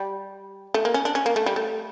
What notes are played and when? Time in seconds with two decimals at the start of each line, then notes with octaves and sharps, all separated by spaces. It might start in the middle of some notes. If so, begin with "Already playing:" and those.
Already playing: G3
0.74 A3
0.85 A#3
0.94 C#4
1.05 D4
1.15 C#4
1.26 A#3
1.36 A3
1.46 G3
1.56 A3